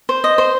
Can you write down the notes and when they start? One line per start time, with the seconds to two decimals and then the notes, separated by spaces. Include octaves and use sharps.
0.09 C5
0.24 D#5
0.38 C5